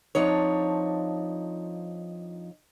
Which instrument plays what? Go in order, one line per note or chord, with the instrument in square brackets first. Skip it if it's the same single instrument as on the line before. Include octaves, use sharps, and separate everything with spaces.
[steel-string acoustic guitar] F2 G#2 F3 D4 D#4 C#5